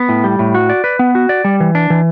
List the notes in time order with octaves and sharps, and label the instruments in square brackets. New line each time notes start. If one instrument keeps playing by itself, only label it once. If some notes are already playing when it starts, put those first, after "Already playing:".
Already playing: [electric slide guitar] B3
A2
G3
A2
F#4
D5
B4
B3
F#4
D5
G3
E3
D4
E3